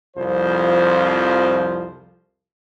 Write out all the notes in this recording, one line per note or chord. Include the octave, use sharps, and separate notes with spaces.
C2 F2 F3 C5